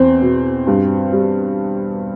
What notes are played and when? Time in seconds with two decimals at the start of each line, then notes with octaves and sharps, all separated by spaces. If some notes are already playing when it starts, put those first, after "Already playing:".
Already playing: E2 C4
0.21 B2
0.67 G2
1.12 G3